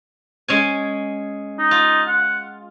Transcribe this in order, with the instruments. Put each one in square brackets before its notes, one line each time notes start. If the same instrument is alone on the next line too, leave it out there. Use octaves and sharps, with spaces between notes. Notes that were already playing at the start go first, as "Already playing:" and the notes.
[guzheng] G#3 C#4 G#5
[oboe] D#4
[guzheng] F4
[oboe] F#5